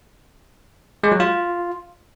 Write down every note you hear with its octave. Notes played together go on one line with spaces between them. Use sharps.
G#3
F#3
F4